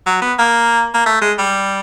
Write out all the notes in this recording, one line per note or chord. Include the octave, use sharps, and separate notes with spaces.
F#3
B3
A#3
A#3
A3
G#3
G3